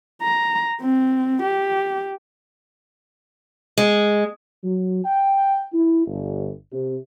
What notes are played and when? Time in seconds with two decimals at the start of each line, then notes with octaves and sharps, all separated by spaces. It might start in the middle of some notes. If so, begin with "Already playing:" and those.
0.22 A#5
0.81 C4
1.43 G4
3.78 G#3
4.64 F#3
5.05 G5
5.73 E4
6.07 G1
6.73 C3